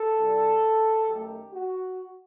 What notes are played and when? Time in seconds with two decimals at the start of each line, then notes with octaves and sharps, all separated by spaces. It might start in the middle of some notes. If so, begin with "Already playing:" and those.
Already playing: A4
0.19 C2 C3 G3
1.09 F#2 D#3 A3 G4
1.53 F#4